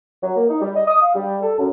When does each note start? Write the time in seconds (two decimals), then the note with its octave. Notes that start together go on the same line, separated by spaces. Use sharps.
0.22 F#3
0.37 A#3
0.48 D#4
0.61 G3
0.76 D#5
0.88 D#6
1.02 F5
1.15 G3
1.42 A4
1.58 F#2